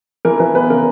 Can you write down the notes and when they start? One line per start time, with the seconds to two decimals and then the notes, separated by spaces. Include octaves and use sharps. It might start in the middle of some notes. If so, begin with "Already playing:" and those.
0.25 E3 A#4
0.39 E3 B4
0.55 B3 B4
0.70 C#3 A#4